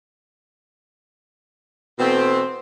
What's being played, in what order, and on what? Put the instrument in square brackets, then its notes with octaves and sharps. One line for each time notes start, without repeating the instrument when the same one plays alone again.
[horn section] B2 E3 A3 C4